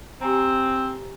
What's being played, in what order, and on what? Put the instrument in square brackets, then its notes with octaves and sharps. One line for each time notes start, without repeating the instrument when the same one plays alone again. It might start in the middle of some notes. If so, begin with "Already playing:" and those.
[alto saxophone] C4 [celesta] G4 G#5 A#5